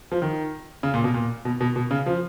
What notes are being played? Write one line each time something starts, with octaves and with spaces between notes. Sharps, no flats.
F3
D#3
C#3
A#2
B2
A#2
B2
B2
B2
C#3
F3